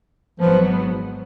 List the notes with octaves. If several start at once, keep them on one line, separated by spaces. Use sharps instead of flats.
G#1 G#2 F3 F#3 B3